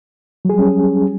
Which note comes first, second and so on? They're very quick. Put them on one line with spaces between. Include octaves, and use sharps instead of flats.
F#3 G#4 G3 C#4